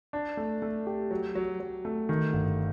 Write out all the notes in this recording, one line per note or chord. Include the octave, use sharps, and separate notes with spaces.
D4
A3
A3
G4
F#3
F#3
F#3
A3
D#3
G1